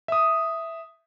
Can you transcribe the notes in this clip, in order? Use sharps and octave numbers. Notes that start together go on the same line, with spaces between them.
E5 D#6